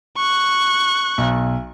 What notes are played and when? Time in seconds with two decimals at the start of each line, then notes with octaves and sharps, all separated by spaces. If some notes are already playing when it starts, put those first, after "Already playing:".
0.17 C#6 F#6
1.18 B1